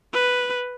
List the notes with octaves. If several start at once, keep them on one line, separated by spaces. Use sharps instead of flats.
B4